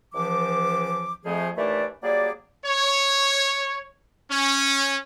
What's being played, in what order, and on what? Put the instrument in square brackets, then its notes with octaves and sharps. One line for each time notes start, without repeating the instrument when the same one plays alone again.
[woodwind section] C#2 E3 F3 D6
F2 F3 A3 G#4
D#2 E3 A3 D4 D5
F#3 G3 A#3 G#4 D5
[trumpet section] C#5
C#4